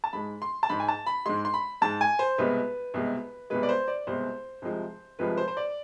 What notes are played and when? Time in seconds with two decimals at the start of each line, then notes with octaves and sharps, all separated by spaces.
0.04 A5
0.13 G#2 G#3 B5
0.42 C6
0.63 A5
0.69 G#2 G#3 B5
0.80 G#5
0.88 A5
1.06 B5
1.26 G#2 G#3 C6
1.45 C6
1.54 B5
1.81 G#2 G#3 A5
2.01 G#5
2.19 C5
2.38 C2 B2 G#3 B4
2.94 C2 B2 G#3
3.50 C2 B2 G#3 B4
3.63 D5
3.69 C5
3.88 D5
4.07 C2 B2 G#3 C5
4.62 C2 C3 F3 G#3
5.19 C2 C3 F3 G#3 B4
5.38 C5
5.48 C5
5.57 D5